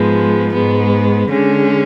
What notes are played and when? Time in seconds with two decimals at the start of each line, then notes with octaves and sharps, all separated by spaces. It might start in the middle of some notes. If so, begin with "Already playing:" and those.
Already playing: G#2 F3 G#3 B3
0.53 G#2 G#3 B3
1.30 D3 G#3 C#4